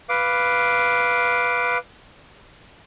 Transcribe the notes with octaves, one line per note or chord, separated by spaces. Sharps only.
B4 F5 D6